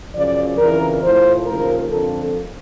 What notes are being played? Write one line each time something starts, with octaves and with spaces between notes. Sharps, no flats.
F#2 C#3 F3 D5
F2 C#3 E3 A#4
A2 F3 C5
D#2 C#3 F3 A#4
F2 D3 F3 A4